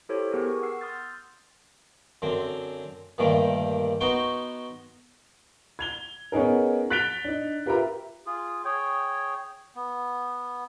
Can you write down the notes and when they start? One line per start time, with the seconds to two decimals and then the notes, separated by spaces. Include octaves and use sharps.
0.09 E4 G4 A4 C5 C#5
0.31 B3 G4 G#4 A#4
0.46 C#6
0.63 F#5 E6 C7
0.81 C6 D#6 F6 G6 A6
0.96 G6
2.22 F#2 D3 C4
3.18 G2 A#2 D3 D#3 G3 A3
4.01 B3 D#4 F#4 G5 C6 C#6
5.79 G#6 F7 G7
6.32 B3 C#4 D#4 G#4 A#4
6.90 F#6 A6 B6 D7 F7 G7
7.25 D4 D#4
7.66 F4 G4 A#4 B4 E5 A#5
8.26 F4 G#4
8.65 G#4 C#5 G5
9.75 B3